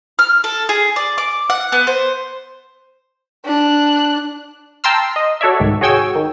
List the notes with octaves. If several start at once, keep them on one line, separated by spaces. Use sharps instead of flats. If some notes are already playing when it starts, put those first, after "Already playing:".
F6
A4
G#4
D5
D6
F#5
B3
C5
D4 F#6
G5 A5 A#5 C6 E6 F6
D#5
F#4 A4 C#5 D5 E5
C2 G#2 D#3
F#4 G#4 C#5 G5 G#5 E6
D#3